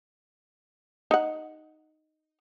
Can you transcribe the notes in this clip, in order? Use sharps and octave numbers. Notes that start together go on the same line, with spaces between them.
D#4 F#5